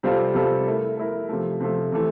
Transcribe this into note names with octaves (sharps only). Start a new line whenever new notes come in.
C3 G3 C4 F4 A4
C3 G3 C4 F4 A4
A3 E4 A#4
A3 E4 A#4
C3 F3 A3
C3 F3 A3
C3 E3 A3